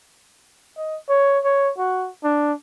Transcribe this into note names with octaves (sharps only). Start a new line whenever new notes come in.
D#5
C#5
C#5
F#4
D4